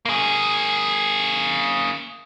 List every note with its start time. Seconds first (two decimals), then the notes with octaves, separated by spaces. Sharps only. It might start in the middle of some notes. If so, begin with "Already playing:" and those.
0.05 A#3 G#4